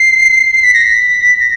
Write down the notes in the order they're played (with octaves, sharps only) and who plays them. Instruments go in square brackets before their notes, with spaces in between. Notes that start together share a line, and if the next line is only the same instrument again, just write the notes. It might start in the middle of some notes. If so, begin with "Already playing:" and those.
Already playing: [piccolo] C7
C7
B6
A#6
B6
A#6